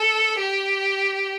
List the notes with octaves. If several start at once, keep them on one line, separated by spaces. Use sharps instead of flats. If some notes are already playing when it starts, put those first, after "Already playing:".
Already playing: A4
G4